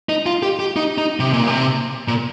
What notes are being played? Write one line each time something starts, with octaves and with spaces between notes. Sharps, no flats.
D#4
F4
G4
G4
D#4
D#4
C3
A#2
C3
A#2